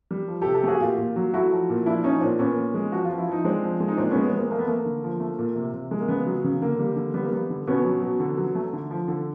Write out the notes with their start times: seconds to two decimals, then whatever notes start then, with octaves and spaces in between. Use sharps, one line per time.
0.11 G3
0.28 F3
0.42 G4 A4
0.46 C3
0.55 G4 A4
0.64 A3 F#4 G#4
0.81 A#2 F4 G4
0.98 A#2
1.16 F#3
1.34 A3 E4 F#4
1.51 F3
1.70 A#2
1.86 F3 D4 E4
2.04 F3 C#4 D#4
2.21 A#2 C4 D4
2.39 A#2 B3 C#4
2.58 A#2
2.74 G#3
2.92 F3 F#4
3.05 F4
3.10 F3
3.18 E4
3.28 F3 D#4
3.45 G#3 C4 D4
3.63 F3
3.80 G#3
3.88 D#4
3.97 A#2 C4 D4
4.11 G#3 B3 C#4
4.24 B3
4.33 G#3 A#3 C4
4.51 A3 A#3
4.59 B3
4.67 A3 A#3
4.86 D3
5.04 F3
5.20 A3
5.39 A#2
5.55 C3
5.73 C3
5.91 G#3
6.00 A#3
6.08 C#3 B3
6.27 F#3
6.44 C#3
6.61 D3 A#3
6.79 G3
6.96 D3
7.14 G3 B3
7.24 A#3
7.32 G3 B3
7.50 D3
7.67 B2 B3 C#4
7.84 F#3
8.02 B2
8.20 D3
8.37 F#3
8.55 A3
8.73 D3
8.91 F3
9.08 D3